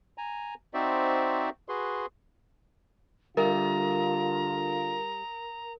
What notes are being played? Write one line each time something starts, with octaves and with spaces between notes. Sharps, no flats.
G#5 A#5
C4 D#4 F#4 C5 D5 E5
F#4 G#4 B4 C6
D3 G3 F4 A#4 E5 A#5